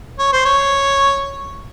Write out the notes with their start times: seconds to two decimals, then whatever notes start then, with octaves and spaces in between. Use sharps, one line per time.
0.19 C#5
0.33 C5
0.45 C#5